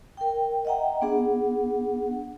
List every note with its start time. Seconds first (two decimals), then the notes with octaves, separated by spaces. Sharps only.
0.17 A#4 G5
0.65 D#5 E5 F#5 G5 A#5
1.02 B3 D4 G#4 F#5